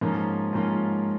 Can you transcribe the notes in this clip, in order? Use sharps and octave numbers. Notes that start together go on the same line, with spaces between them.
G#2 F3 A#3 C#4 F4
G#2 F3 A#3 C#4 F4